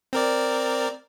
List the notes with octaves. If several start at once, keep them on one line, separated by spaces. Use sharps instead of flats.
C4 A#4 D5